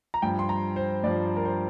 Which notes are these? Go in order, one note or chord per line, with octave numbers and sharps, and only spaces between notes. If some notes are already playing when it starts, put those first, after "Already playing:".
A#5
G2 F3 G5
C6
A#5
C5
G2 F3 D5
A#4
C5